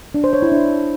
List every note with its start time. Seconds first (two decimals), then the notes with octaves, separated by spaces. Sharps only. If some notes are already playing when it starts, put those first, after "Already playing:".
0.14 D4
0.24 C5
0.33 C#5
0.42 E4
0.52 D4